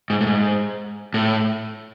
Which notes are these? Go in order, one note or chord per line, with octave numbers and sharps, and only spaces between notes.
G#2
A2
G#2
A2